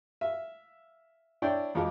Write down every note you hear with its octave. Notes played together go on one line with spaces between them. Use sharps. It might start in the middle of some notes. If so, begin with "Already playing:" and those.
E5 F5
D4 E4 C#5 D5 G5
F2 F3 F#3 G#3 F5 D6